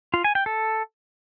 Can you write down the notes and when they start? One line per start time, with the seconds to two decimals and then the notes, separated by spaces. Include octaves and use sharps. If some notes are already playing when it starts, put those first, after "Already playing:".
0.14 F4
0.24 G#5
0.35 G5
0.46 A4